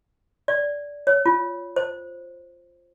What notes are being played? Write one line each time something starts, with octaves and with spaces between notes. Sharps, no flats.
D5
C#5
F4
C5